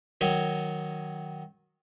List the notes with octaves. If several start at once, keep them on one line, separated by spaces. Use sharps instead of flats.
D#3 F#3 C#5